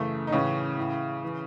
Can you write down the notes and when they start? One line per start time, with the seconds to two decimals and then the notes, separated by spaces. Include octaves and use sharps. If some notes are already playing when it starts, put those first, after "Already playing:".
Already playing: F#2 C#3 E3 A3
0.27 D#4
0.32 A2 C#3 E3 C#4
0.77 A2 E3
1.24 E3